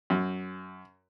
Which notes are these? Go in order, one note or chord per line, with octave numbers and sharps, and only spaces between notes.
F#2